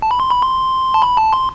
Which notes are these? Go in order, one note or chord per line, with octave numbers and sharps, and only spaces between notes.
A5
B5
C6
B5
C6
A5
B5
A5
C6